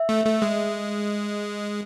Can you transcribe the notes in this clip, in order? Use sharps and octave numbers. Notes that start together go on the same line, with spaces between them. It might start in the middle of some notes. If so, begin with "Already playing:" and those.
Already playing: E5
A3
A3
G#3